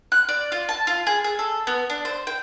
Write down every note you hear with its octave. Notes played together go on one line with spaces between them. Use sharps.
F#6
D5
F4
A5
F4
G#4
G#4
A4
B3
D4
C5
G5